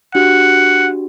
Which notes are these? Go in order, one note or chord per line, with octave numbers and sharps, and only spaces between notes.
D4 F#4 G4 F#5